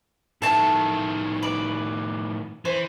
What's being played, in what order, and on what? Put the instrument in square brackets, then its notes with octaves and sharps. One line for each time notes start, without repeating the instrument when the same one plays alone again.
[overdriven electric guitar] A2 D#3 [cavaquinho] A4 E5 A5
[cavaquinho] B4 D5 B5
[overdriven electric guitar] E3 [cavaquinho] C5